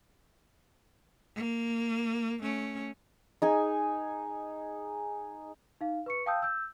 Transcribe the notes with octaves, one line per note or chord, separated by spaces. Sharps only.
A#3
A3 C#4
D#4 G#4 G#5
D#4 F5
B4 C#6 C#7
F5 G5 A5 D#6 E6 G6
E6 G6